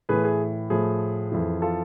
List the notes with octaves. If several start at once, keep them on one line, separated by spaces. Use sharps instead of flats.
A2 E3 G#4 B4
G#4
A2 F3 G#4
F2 E3
F4 A4